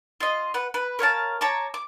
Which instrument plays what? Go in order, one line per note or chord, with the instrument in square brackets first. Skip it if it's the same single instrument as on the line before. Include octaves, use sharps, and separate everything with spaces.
[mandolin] F4 D#5
B4 F#5
B4
A#4 C#5 F5 A5
C#5 A5 A#5 D6
D6